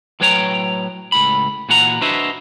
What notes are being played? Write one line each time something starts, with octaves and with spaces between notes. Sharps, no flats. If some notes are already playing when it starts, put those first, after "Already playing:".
A2 F#3 B4 C#5 G5 A#5
C#2 A2 B5
A#2 E3 F#4 F#5 A#5
D4 F#4 B4 C5 D#5 E5